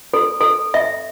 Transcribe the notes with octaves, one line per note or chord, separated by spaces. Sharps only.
A4
A4
E5